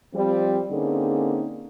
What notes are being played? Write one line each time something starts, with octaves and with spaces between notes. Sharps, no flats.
F3 G3 C4
D3 A#3 C4 C#4 D#4 G#4